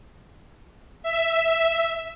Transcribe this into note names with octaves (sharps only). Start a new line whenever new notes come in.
E5